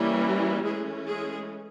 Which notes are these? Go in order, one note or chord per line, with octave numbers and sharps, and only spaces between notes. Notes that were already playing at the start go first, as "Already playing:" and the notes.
Already playing: E3 G3 A#3 C#4
E3 G#3 A3 C#4 G#4
G#3 G#4